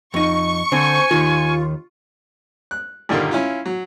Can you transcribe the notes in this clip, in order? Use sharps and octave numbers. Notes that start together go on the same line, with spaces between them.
F2 D#4 C#6
D3 C4 C5 G#5
D#2 D#3 F4
F#6
G2 A#2 D3 D#3 G3 A#3
C#4 E4 F4
F#3